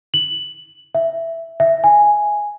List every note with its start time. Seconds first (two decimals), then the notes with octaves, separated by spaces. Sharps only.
0.14 F#7
0.95 E5
1.60 E5
1.84 G#5